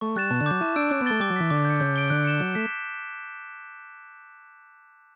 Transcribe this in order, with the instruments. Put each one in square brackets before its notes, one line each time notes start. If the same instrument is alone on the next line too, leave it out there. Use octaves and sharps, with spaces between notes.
[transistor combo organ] A3 [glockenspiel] C#6
[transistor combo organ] G3 [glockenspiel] F#6 A6 E7
[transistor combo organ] B2 [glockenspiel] A5
[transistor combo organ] D3
[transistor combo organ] F#3 [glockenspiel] D6 G6
[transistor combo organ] E4 [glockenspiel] A5
[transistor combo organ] D4 [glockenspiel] E6 G6 D7
[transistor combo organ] C#4 [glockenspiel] F#6
[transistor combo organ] B3
[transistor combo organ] A3 [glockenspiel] A6 D7 G7
[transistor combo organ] G3 [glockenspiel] D6
[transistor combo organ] F#3
[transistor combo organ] E3 [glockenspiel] F#6 B6
[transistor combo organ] D3 [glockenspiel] D6
[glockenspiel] G6
C#7
[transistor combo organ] C#3 [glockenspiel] G6
[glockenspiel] D7 G7
[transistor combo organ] D3 [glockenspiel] F#6
[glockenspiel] C#7 E7 G7
[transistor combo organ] F#3 [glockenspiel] F#6
[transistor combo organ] A3 [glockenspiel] B6 E7